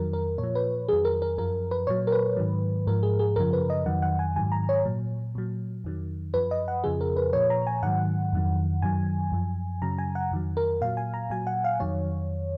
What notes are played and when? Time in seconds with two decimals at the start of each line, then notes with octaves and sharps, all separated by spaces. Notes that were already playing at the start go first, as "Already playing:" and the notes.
Already playing: F2 D#3 F#3 A#4
0.13 A#4
0.38 A#2 C#5
0.43 F3
0.55 B4
0.88 F2 D#3 F#3 G#4
1.05 A#4
1.22 A#4
1.38 F#2 F3 A#4
1.71 B4
1.87 A#2 F#3 C#5
2.07 A#4
2.12 B4
2.37 G#2 D#3 F#3
2.87 G#2 F3 A#4
3.03 G#4
3.19 G#4
3.36 F#2 C#3 F3 A#4
3.53 B4
3.70 D#5
3.86 F2 D#3 F#3 F#5
4.02 F#5
4.19 G#5
4.36 G#2 D#3 F#3 G#5
4.52 A#5
4.69 C#5
4.85 A#2 F#3
5.35 A#2 F#3
5.84 F2 D#3 F#3
6.34 F#2 F3 B4
6.51 D#5
6.68 F#5
6.84 F2 C#3 F3 G#4
7.01 A#4
7.17 B4
7.33 A#2 F3 C#5
7.50 A#5
7.67 G#5
7.83 G#2 D#3 F#3 F#5
8.33 F2 D#3 F#3
8.82 F#2 D#3 F#3 G#5
9.32 F#2 F3
9.82 F#2 C#3 F#3 A#5
9.98 G#5
10.15 F#5
10.31 F2 D#3 F#3
10.57 A#4
10.81 A#2 F#3 F5
10.97 G#5
11.14 A#5
11.30 A#2 F#3 G#5
11.47 F#5
11.64 F5
11.80 F2 D#3 F#3 C#5